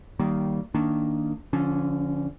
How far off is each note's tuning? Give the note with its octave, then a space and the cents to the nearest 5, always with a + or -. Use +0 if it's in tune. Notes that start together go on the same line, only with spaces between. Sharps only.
D#3 -5 G3 -30 A#3 +0
D#3 +0 A#3 -10 D4 +0
D3 -25 F3 +0 C#4 +0